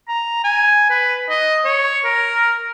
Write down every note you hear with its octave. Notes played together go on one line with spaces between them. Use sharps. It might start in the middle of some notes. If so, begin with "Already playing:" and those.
A#5
G#5
B4
D#5
C#5
A#4